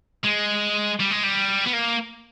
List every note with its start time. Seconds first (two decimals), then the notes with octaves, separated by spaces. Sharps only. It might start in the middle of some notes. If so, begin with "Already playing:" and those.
0.24 G#3
1.00 G3
1.10 G#3
1.23 G3
1.67 B3
1.73 A#3